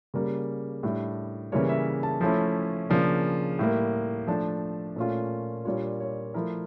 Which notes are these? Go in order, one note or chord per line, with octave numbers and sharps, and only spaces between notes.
C#3 G3 A#3 A#4
A2 G3 D4
C#3 E3 G3 A#3 C#5
E5
A5
F3 A3 C#4 E4 A5
C#3 F3 A#3 D4
A2 G3 A#3
F3 A3 D4 A5
A#2 A3 C#4 F4
A#2 G3 D4 F4 C#5
C#5
F3 A3 E4 A#4